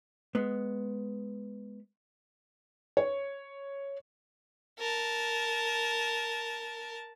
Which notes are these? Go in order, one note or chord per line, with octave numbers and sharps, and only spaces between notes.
G#3 B3
C#5
A#4 A5